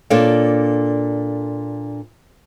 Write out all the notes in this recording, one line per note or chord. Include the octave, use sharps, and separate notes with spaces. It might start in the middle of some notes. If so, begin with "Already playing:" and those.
A#2 D4 A4 C#5 D5 F5